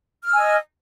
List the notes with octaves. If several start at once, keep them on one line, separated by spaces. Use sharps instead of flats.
D#5 G#5 E6 F6